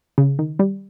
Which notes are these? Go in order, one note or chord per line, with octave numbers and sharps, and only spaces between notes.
C#3
D#3
G3